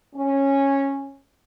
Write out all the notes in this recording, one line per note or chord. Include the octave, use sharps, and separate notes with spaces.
C#4